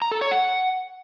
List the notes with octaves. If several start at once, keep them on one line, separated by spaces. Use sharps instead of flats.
A#5
A4
C#5
F#5